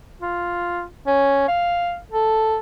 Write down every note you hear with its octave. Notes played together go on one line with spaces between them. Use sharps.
F4
C#4
F5
A4